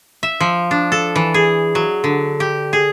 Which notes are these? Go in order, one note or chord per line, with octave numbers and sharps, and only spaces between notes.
E5
F3
D4
A4
E3
G#4
F#3
D3
G4
G#4